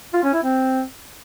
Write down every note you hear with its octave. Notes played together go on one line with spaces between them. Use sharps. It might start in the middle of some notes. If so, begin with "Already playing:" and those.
F4
C#4
E4
C4